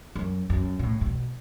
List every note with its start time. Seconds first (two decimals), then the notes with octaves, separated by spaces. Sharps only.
0.16 F#2
0.50 F#2
0.79 B2
0.83 A2
1.01 A2
1.06 B2